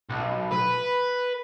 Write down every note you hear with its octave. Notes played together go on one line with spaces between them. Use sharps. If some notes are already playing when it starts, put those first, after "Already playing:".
B1
B4